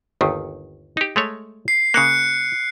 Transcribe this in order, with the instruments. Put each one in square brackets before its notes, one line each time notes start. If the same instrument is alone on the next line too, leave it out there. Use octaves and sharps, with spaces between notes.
[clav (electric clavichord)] G1 D#2 D#3
D#4 G4
G#3 A3 C#5
[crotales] C7
[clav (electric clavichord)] C#3 A#3 [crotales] F#6 C#7